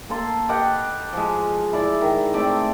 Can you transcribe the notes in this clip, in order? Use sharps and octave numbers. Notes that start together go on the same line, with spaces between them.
A#3 A4 C6
G4 B4 D#5 F#5
F3 G#3
E4 D5
D#3
A3 C4 D5 E5